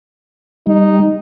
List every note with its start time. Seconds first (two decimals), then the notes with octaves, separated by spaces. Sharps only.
0.67 G3 D#4